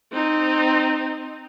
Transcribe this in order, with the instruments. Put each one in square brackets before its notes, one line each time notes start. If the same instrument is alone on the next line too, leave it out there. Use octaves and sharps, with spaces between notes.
[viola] C4 D#4